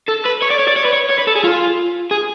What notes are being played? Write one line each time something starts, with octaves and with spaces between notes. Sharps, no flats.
A4
B4
C#5
D5
C#5
D5
C#5
B4
C#5
C#5
B4
A4
G#4
F4
G#4